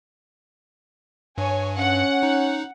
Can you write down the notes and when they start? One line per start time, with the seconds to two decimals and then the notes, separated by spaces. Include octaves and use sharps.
1.38 G2 C#5 G#5
1.78 C#4 F#5
2.23 D#4